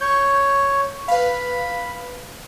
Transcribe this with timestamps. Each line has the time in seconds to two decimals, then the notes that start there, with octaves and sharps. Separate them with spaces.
0.01 C#5 C#6 G6
1.08 B4 F5 B5